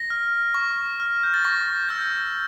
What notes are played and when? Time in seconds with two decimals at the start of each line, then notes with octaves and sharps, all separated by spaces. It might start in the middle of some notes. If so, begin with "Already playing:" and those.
Already playing: A#6
0.10 F6
0.54 C#6
1.00 F6
1.23 G6
1.34 A6
1.44 C#6 A#6
1.89 E6 G6